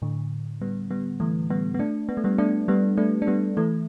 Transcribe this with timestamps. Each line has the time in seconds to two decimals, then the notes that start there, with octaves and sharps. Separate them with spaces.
0.02 A2 D3
0.61 G3 B3
0.91 G3 B3
1.20 E3 A3
1.50 G3 B3
1.74 B3
1.79 A3 D4
2.09 B3
2.17 A3
2.24 G3 B3
2.38 A3 D4
2.68 G3 B3
2.97 A3 D4
3.22 D4
3.27 G3 B3
3.57 E3 A3